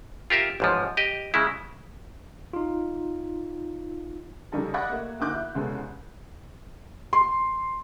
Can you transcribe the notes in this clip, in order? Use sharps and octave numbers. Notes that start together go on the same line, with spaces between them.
F4 G4 A#4 E5
A1 G#2 F3
G4 D#5
C#3 G#3 E4
D#4 F4
C#3 F#3 G3 D#4 A4 A#4
D5 D#5 F#5 B5 F#6 G#6
A3 A#3
D2 A#3 D#4 D6 F#6 G6
E4
C2 C#3 G#3 B3 A4
C6